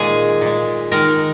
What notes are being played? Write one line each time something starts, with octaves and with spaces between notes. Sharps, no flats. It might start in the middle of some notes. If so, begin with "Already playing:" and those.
Already playing: A#2 D#3 G#3 A#3 G#4
A#2 G#3
D#3 G#3 A#4